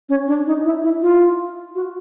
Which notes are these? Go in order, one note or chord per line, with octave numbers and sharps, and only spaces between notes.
C#4
D4
D#4
E4
E4
F4
F#4